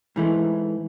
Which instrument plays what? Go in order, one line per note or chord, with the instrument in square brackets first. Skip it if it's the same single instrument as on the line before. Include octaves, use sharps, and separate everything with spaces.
[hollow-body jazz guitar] G#2 E3 A3